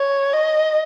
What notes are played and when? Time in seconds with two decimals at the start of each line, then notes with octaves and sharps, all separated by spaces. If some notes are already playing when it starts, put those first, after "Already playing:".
Already playing: C#5
0.33 D#5